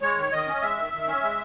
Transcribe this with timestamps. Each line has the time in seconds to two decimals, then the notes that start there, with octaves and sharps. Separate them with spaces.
0.02 G#3 C#5
0.17 D#3
0.32 D#3 D#5
0.47 C#4
0.62 G#3 E5
0.78 D#3
0.93 D#3
1.07 C#4
1.23 G#3